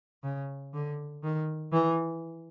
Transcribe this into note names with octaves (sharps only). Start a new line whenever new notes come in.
C#3
D3
D#3
E3